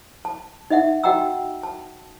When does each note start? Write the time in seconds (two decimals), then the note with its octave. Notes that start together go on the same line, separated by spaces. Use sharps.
0.25 A5
0.70 D#4 D#5 E5 F#5
1.04 F#4 D#5 F#5 G5 A#5 E6
1.63 A5